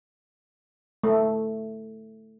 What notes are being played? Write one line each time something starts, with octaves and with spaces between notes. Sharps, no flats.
A3